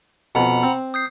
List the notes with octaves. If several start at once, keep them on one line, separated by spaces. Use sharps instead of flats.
F2 B2 F#5 A#5 B5
C4
D#6 G6 C7